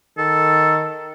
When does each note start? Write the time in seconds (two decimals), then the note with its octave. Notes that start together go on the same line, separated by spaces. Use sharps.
0.18 D#3 A4